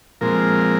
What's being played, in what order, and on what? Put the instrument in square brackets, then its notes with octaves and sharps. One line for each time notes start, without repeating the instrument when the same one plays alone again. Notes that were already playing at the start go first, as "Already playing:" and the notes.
[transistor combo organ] A#2 F3 G#3 C4 A#4